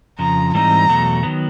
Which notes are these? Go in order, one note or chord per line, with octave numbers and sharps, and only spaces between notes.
F2 C#3 F3 A#5
G#2 E3 G3 C4 D#4 A#5
E2 B2 F#3 A3
D#3 F#3 B3